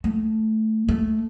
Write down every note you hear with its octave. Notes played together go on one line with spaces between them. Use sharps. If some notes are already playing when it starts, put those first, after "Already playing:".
A3
A3